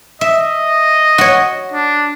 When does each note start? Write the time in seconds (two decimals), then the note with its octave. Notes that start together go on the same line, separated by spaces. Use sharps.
0.21 D#5 E5
1.18 F#4 C#5
1.72 D4